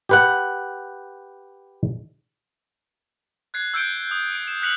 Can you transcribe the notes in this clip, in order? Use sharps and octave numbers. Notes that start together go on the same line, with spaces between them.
G4 B4 F#5
F#6 G#6 C7
E6 G6 C#7 D7 G7
D#6
D7
E7
F6 F#6 B6 C#7 F7 F#7